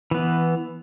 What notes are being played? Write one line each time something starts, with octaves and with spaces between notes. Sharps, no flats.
E3 B3